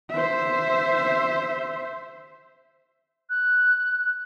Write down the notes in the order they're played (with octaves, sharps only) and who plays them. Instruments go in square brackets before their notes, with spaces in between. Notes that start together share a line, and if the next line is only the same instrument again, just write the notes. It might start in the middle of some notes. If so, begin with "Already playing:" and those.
[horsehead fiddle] C5 E5
[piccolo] F#6